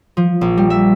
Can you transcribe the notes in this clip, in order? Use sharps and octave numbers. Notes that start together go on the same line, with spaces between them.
F3
A#1
G3
E5